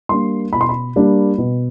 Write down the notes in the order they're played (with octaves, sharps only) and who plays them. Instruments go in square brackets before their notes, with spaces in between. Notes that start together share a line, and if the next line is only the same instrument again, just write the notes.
[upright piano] G3 A#3 D4 C6
B2 B5
C6
B5
G3 A#3 D4
B2